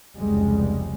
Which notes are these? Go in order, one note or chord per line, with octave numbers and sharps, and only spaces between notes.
F1 C#2 G3 G#3